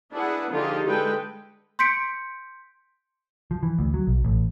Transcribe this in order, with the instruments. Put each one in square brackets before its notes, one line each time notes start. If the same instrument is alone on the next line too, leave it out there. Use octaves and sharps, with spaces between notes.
[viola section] D4 E4 G#4 B4 F#5
D3 F3 D#4 F4 G4 G#4
D3 G#3 A4 B4 G5
[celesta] C6 G6 B6 C#7 D7
[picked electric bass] F3
E3
D2
F#3
B1
A1